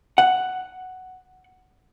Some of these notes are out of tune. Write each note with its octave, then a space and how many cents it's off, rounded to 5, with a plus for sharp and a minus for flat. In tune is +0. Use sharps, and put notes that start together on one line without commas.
F#5 +5